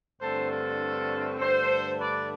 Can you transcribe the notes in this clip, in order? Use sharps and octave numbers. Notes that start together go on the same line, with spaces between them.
G2 D3 A3 C4 A4 C5
F4 A4
G2 D3 A3 A4 C5
B4 D5